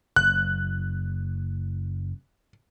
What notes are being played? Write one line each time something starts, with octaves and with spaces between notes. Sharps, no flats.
F#1 F#6